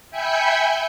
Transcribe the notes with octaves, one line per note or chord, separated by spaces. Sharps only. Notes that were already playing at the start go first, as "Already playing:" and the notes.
E5 G5 G#5 B5 G6 C#7